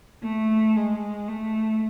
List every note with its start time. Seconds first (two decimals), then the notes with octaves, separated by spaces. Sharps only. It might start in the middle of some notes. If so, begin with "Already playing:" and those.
0.24 A3
0.76 G#3
1.28 A3